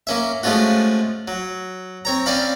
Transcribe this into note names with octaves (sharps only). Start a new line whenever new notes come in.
A#3 C#4 E5
F3 G#3 A3 C#4 F4 F#4
F#3
C4 C#5 A#5
C4 C#4 D5 F5 B5